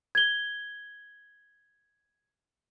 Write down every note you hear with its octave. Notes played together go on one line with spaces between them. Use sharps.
G#6 G7